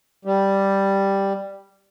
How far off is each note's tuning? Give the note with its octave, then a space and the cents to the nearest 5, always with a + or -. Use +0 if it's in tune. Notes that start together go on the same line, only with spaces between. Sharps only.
G3 +0 G4 +0